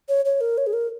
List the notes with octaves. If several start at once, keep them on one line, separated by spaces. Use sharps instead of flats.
C#5
C#5
A#4
C#5
G#4
A#4